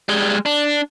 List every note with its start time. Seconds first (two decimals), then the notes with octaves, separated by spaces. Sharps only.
0.09 G3 G#3
0.46 D4